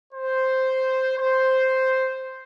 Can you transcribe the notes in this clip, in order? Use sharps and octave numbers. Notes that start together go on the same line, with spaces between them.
C5
C5